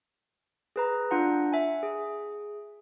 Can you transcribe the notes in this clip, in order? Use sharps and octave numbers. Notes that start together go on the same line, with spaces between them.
G#4 B4 A#5
D4 F4 F#5 A#5
E5 G#5
G#4